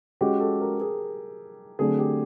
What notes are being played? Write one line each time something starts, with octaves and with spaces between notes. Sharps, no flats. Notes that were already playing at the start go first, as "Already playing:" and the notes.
G#3 C#4 F#4 G4
A4
A#4
G#4
D3 F#3 A3 C4 G#4
G4